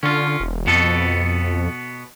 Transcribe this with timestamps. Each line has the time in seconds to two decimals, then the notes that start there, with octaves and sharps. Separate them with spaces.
0.03 D3 C#4 F4
0.40 E1
0.67 F2 B2 B3 A4